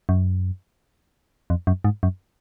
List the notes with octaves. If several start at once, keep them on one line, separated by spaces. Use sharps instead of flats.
F#2
F2
F#2
G#2
F#2